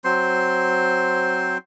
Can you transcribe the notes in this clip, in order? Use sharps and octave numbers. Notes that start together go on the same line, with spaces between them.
F#3 C4 C5 C6